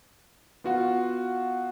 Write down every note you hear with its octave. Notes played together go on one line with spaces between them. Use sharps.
B3 F4 F#4 F5 F#5